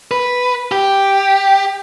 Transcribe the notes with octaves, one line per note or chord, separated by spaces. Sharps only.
B4
G4